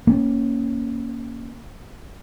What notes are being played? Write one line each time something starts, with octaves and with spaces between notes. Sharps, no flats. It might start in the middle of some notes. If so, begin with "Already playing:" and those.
A#3 C#4